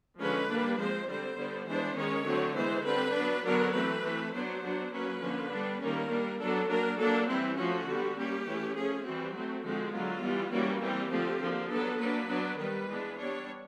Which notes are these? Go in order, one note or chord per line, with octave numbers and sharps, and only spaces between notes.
D3 F3 G#3 C#4 B4
G3 A#3 D4
F3 G#3 C4 C5
D3 G3 C4 C5
D3 G3 B3
E3 G#3 B3 D4 C5
D#3 G#3 C#4 C#5
D3 F#3 A3 C4
E3 G#3 B3 C5
D3 G3 C4 B4
F#3 B3 D4
D3 F#3 B3 D4 A#4
E3 A3 C4 B4
E3 A3 C4
F#3 B3 D4 C5
F#3 B3 D4
F#3 A#3 C#4 B4
D3 F3 A#3 C#4
G3 B3 D4
D#3 G3 A#3 C#4 A#4
G3 A#3 D4
F#3 B3 D4 A4
F#3 A#3 D4 A#4
F#3 A#3 D4 A4
E3 G3 C4 E4
F3 A3 C#4 F#4
D3 G3 B3
G3 A#3 C#4 G4
E3 A3 C#4
F3 A3 C#4 G#4
E3 G3 C4 F#4
F#3 A3 C4
D3 F3 G#3 C4 F#4
D3 F#3 B3 F4
E3 G3 B3
E3 G3 A#3 C#4 F#4
E3 G3 C4 G4
D3 F3 A3 C4
D3 F3 A#3
F#3 B3 D4 A4
F#3 A#3 D4 B4
F#3 B3 D4
D#3 G3 B3 B4
E3 G#3 B3 D4
G3 B3 D4 C#5